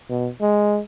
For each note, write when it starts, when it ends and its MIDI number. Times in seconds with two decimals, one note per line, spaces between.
0.10 0.29 47
0.41 0.79 56